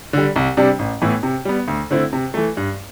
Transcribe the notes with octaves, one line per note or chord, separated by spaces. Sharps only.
D3 G3
C2
C3 G3 D4
A1
A2 E3 B3 E4
C3
G3 B3
D2
D3 A3 C4 E4
C3
E3 A3
G2